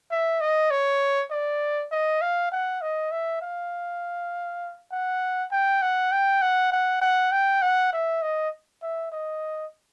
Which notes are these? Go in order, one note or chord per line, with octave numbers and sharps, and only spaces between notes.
E5
D#5
C#5
D5
D#5
F5
F#5
D#5
E5
F5
F#5
G5
F#5
G5
F#5
F#5
F#5
G5
F#5
E5
D#5
E5
D#5